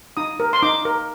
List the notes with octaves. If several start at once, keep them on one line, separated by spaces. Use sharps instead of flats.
D#4 D#6
A#4
C6
D#4 D6
A#4